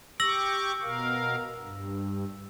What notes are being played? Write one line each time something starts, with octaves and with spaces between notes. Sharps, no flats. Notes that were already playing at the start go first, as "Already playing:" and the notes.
G4 C#6 D6 E6 A#6 F#7
B2 A#4 F5
G2